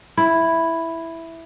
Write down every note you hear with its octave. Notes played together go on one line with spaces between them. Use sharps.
E4